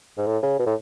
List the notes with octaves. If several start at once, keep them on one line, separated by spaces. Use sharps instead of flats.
G#2
A2
C#3
B2
A2